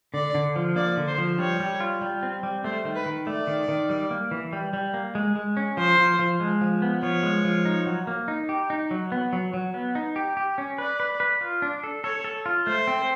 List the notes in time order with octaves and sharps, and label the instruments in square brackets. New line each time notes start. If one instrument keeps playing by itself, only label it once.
[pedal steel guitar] D3 [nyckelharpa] D5
[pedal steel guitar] D3
F3
[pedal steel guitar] A#3 [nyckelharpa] D5
[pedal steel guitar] D3
[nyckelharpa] C5
[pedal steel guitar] F3
[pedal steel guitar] G3 [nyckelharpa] C#5
[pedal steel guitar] G3
F4
G3
C4
G3
[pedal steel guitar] A3 [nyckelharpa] C5
[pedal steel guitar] D#3
[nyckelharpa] B4
[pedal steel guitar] D#3
[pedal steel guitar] A3 [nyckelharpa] D5
[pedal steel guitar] D#3
D#3
G3
A#3
E3
G3
G3
A#3
G#3
G#3
C#4
[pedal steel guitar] F3 [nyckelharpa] C5
[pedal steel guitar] F3
F3
G#3
F3
B3
[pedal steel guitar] F3 [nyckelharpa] C#5
[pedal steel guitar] G#3
F3
D#4
F#3
A#3
D#4
G4
D#4
F#3
B3
F#3
F#3
B3
D#4
G4
G4
C#4
[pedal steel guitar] B4 [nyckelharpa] D5
[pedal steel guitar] B4
B4
F4
D4
A4
[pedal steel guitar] A4 [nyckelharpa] C#5
[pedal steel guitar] A4
F4
[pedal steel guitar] A3 [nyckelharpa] C5
[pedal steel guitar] C4